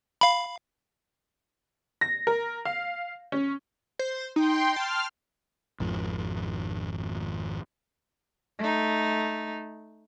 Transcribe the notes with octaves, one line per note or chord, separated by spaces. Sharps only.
F5 B5
A#6
A#4
F5
C#4
C5
D#4 G5 C6
A5 F6
G#1 F2
A3 D#4